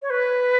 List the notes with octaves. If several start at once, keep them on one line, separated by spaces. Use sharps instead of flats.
C#5
B4